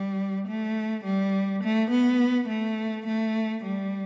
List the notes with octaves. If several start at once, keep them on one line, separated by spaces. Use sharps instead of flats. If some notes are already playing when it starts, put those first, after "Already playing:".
Already playing: G3
A3
G3
A3
B3
A3
A3
G3